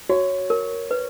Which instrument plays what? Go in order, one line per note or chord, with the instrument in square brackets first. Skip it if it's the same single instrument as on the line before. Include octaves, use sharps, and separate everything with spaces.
[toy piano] F#4 [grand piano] C#5
[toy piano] A#4
B4